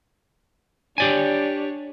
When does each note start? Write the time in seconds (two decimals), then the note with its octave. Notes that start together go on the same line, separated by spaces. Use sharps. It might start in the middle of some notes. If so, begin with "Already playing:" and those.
0.98 D4 G4 C#5 D5 G#5